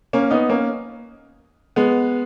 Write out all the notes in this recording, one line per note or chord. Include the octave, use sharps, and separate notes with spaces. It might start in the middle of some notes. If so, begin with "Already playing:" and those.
A#3 C#4
B3 D#4
A#3 C#4
G#3 B3